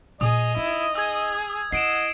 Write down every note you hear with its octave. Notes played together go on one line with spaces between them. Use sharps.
A#2 G#4 D#5 D#6
D#4 E4
G#4 E6 G#6
E4 D#5 F#5 C7 D7 E7